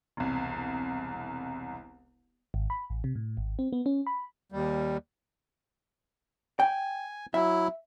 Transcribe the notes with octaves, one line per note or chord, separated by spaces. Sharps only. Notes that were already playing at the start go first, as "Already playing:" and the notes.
E1 C2
G#1
B5
A1
C3
A2
G#1
C4
B3
C#4
B5
D#2 G3
G5 G#5
F#3 E4 E5